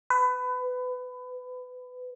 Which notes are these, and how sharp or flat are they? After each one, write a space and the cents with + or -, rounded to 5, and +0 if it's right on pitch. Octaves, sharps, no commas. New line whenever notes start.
B4 +25